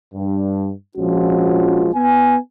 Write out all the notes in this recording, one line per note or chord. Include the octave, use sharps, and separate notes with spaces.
G2
A#1 F3 G#3 C#4 F4 F#4
B3 G#5